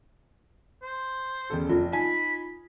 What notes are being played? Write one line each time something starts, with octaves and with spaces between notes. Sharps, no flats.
C5
E1 C#3 A4
F1 F4
D#4 G#5 B5